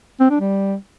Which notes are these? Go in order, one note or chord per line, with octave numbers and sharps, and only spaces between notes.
C4
D4
G3